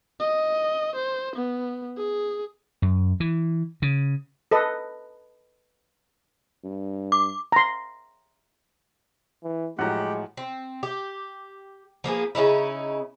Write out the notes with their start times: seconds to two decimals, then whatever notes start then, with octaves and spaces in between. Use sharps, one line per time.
0.20 D#5
0.95 C5
1.35 B3
1.97 G#4
2.82 F#2
3.20 E3
3.82 C#3
4.51 A4 B4 D#5
6.64 G2
7.12 D6
7.52 A#5 C6
9.44 E3
9.79 A2 F3 F#3 G#3 G4 F#5 A#5
10.37 C4
10.83 G4
12.04 F3 A#3 B3 G#4
12.35 C#3 C#4 D#4 E4